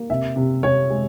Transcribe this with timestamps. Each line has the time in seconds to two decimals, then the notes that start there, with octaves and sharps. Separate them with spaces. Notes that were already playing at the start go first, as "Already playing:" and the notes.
Already playing: A#3
0.10 C3 E5
0.36 C3
0.63 C3 C#5
0.90 G#3